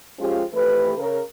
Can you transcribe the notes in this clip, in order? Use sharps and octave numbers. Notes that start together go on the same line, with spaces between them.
F3 G#3 C#4 F4 G4
F2 E3 A3 G4 B4
C#3 A#4